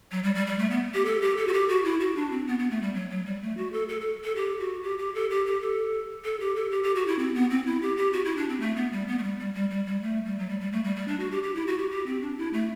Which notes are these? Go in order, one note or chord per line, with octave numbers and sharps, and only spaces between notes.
F#3
G3
G3
G3
A3
B3
G4
A4
G4
A4
F#4
G4
F#4
E4
F#4
D4
C4
B3
B3
A3
G3
F#3
F#3
G3
A3
F#4
A4
A4
A4
A4
G4
F#4
G4
G4
A4
G4
G4
A4
A4
G4
A4
G4
G4
F#4
E4
C4
B3
C4
E4
G4
G4
F#4
E4
D4
C4
A3
B3
G3
B3
A3
G3
G3
G3
G3
G3
A3
G3
F#3
G3
G3
A3
G3
G3
D4
F#4
G4
G4
E4
F#4
G4
G4
C4
D4
E4
A3